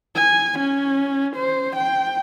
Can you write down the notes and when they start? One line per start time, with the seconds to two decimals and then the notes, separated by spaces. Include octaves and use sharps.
0.16 G#5
0.59 C#4
1.36 C5
1.76 G5